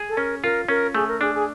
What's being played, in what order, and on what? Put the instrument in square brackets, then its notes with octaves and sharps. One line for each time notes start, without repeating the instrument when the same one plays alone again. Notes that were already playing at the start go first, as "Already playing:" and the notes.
Already playing: [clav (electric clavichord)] G#4
[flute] A4
[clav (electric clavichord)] C#4 [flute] A#4
[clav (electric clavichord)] F4 [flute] A#4
[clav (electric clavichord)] C#4 [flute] A#4
[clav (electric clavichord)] A3 [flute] G#4
[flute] A#4
[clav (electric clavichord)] D4 [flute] G#4
[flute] G#4